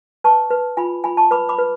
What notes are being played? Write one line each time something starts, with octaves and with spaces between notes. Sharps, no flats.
B4 A5 C#6
B4
F4 G#5 B5
F4 G#5 B5
A5 C#6
B4 B5 D6
B5 D6
B4